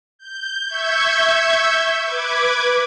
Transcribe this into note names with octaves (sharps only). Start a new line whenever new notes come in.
G6
E5 C#6 G6 G#6
B4 D6 G#6